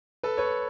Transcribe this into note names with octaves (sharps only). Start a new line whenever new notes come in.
A4 B4
B4 C#5